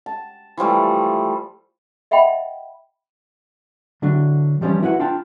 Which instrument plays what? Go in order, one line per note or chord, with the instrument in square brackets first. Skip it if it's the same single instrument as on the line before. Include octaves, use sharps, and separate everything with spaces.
[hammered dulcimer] A5
E3 F3 G3 A3
[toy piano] D#5 E5 F#5 G5 B5
[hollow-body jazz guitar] D3 F#3 D4
E3 F3 G3 A#3 C#4
E4 F#4 B4 F#5
D4 F4 G5 A5